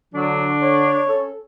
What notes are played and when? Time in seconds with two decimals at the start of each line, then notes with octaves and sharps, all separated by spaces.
0.14 D3 F#3 D4
0.61 C#5
1.07 C#4 A4